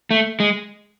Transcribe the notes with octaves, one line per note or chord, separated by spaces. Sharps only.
A3
G#3